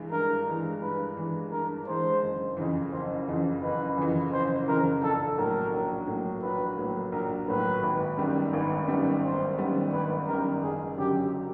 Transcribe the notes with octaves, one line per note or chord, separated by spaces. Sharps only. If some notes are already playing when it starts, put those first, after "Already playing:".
Already playing: G2 E3 G#3
G2 A#4
E3 G#3
G2 B4
E3 G#3
G2 A#4
E3 G#3 C5
F#1
F2 C#3 E3
F#1 C5
F2 C#3 E3
F#1 B4
F2 C#3 E3
F#1 C5
F2 C#3 E3 A#4
A#1 A4
A2 F#3 A#3 A#4
A#1
A2 F#3 A#3
A#1 B4
A2 F#3 A#3
A#1 A#4
A2 F#3 A#3 B4
G#1
F#2 D#3 G3 B3
G#1 B4
F#2 D#3 G3 B3
G#1 C5
F#2 D#3 G3 B3
G#1 B4
F#2 D#3 G3 B3 A#4
F#1 G#4
F#2 D3 F#3 G4